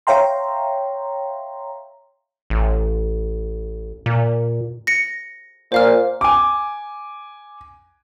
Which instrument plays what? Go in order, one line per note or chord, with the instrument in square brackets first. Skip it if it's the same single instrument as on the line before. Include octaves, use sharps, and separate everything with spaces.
[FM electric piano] C#5 E5 F5 G5 A#5 C6
[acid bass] A1
A#2
[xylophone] A#6 C#7
[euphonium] A#2 [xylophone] C5 F5 F6
[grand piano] G#5 D6